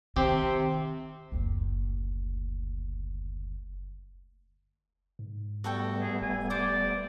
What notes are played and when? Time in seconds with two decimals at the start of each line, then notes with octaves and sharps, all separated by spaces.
0.16 C3 D#3 C4 G4
1.32 F#1 D2
5.19 G#2
5.64 G3 A3 B3 F#4 A4 G5
6.00 G#4
6.21 E1 G#5
6.50 C5 D5 D6